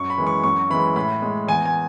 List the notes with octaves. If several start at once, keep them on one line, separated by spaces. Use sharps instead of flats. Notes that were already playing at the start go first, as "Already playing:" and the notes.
Already playing: F#2 C#6
B5
E3 G#3
C#6
F#2 C#6
E3 G#3 B5
A2 B5
G#3
E2 G#5
G#5